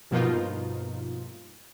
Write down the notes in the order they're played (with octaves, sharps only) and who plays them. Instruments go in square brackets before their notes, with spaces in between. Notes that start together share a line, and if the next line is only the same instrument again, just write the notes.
[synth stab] G2 B2 F3 A#3 D#4 F4